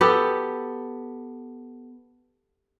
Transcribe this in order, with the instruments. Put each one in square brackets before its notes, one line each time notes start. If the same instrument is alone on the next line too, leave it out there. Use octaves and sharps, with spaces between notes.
[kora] B3 G4 A4